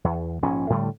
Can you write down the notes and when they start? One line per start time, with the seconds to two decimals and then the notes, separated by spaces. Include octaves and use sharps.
0.04 E2
0.42 A#1 G#2 C#4
0.70 A2 D3 G3 A3